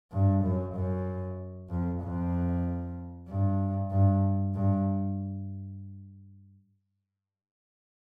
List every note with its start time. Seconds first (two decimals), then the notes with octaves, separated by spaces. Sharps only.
0.12 G2
0.43 F#2
0.75 F#2
1.70 F2
2.02 F2
3.28 G2
3.91 G2
4.55 G2